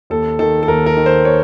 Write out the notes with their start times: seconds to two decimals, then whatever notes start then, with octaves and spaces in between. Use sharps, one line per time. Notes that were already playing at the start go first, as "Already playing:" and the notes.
0.10 D#2 A4
0.39 D#3 A4
0.63 A4
0.68 D#2 A#4
0.86 A#4
0.97 D#3
1.06 C5
1.25 C#5